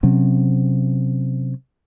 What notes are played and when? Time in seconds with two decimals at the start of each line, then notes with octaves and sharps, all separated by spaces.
0.03 C3 F#3 C4 C#4